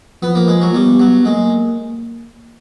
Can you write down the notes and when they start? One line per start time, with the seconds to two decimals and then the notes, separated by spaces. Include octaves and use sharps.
0.22 F3 B3
0.35 A#3
0.48 G#3
0.62 F#3
0.74 G3 B3
1.00 F#3
1.25 G#3 A#3